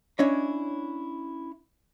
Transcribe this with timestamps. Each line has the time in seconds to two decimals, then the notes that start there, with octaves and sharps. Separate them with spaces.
0.19 C#4 D4 E4 C#5 D#5